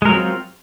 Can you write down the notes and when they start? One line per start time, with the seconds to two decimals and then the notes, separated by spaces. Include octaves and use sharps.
0.02 G#3
0.05 A#4
0.09 F#3
0.12 C4
0.16 F4